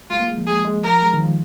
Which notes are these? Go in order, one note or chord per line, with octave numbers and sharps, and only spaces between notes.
G#3 F4
A#3
G#3
F3
G#3 G#4
G#3
F3 A#4
G#3
D#3
F3